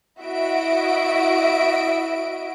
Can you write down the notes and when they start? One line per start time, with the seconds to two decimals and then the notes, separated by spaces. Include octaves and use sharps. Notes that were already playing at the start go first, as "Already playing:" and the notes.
0.20 E4 F#4 D#5 E5 D7